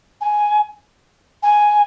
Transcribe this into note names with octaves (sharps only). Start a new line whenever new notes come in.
G#5
G#5